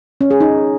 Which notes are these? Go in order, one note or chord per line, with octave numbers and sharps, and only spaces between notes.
C#4
G#4
D#4